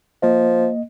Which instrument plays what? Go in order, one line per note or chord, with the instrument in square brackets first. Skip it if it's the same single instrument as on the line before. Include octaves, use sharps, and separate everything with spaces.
[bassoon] F3 [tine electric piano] A#3 D#5